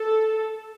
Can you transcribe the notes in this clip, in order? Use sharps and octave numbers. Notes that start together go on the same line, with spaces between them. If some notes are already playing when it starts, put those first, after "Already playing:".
Already playing: A4